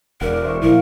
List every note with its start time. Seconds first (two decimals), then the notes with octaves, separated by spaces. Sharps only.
0.21 E1 A#4 D5 F#5
0.43 C5 E5 C#6
0.62 A#2 F3 A#3 E4 A#4